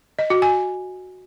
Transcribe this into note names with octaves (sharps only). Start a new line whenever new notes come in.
D#5
F#4
G#5